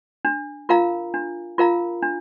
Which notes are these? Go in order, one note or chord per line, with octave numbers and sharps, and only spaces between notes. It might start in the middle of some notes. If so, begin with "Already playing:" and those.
D4
F4 A#4 F5 A#5
D4
F4 A#4 F5 A#5
D4